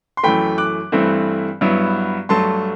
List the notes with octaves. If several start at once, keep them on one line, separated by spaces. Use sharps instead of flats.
C6
F#2 E3 A3 G5 B5
D6 F#6
G2 E3 A3 C4 E4
G2 F#3 B3 E4
G2 F#3 A3 A5 C6